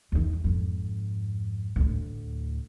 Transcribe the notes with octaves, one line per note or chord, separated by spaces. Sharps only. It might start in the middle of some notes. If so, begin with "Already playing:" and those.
E2 D#3
F2 G#2
D2 A2